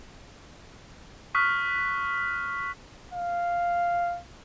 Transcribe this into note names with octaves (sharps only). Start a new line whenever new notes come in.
C#6 D#6 F6 F#6 B6
F5